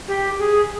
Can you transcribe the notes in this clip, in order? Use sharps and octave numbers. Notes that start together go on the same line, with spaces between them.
G4
G#4